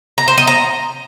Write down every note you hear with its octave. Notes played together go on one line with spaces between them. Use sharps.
A#5
C5
D#5
A#5